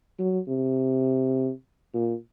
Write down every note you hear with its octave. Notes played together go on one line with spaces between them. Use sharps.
F#3
C3
A#2